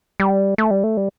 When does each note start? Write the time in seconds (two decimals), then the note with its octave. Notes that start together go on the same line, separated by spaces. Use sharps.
0.20 G3
0.58 A3
0.71 G3
0.84 A3
0.97 G3